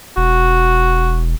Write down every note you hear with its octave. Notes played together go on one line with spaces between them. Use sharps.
E1 F#4